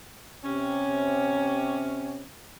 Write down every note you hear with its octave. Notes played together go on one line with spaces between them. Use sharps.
C3 C#4